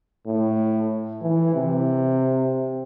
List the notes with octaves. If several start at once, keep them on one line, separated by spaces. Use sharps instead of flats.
A2
E3
C3